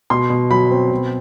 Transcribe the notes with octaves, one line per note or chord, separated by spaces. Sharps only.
B2 C6
B2
F#3 B5
C4
B2